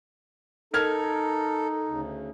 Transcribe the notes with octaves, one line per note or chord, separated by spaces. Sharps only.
D#4 A4 A#4 F6 G#6
D2 C#3